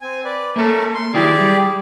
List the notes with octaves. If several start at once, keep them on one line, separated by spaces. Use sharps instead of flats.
C4 G#5
B4 D5
A3 A#3 C#4 A4 A#4
C6
D#3 F#3 E4 G4 G#4 D5
G3